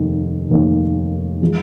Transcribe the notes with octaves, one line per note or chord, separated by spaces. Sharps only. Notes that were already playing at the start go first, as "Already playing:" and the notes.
Already playing: F1 D#2 D#3
F1 D#2 D#3 A#3
F3 G#3